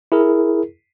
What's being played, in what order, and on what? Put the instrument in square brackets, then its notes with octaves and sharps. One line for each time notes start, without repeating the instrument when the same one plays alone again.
[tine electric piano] E4 G#4 A#4